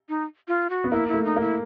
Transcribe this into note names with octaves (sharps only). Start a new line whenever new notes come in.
D#4
F4
F#4
B3
A#3 E4
E4
A3
D#4
A#3 E4